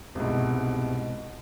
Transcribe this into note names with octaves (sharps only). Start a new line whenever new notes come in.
C2 G#2 B2